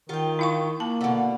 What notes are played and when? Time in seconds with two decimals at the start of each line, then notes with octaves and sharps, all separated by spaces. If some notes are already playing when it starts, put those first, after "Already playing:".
0.09 D#3 F4 G5
0.39 E4 F5 C#6
0.80 A#3 A5
1.01 B2 D3